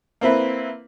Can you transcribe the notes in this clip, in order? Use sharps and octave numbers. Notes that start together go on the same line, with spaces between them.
A#3 C4 E4 B4